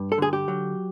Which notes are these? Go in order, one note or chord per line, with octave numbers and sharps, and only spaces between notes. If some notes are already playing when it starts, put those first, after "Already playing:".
Already playing: G2
A4
D3 G#4
G4
F#3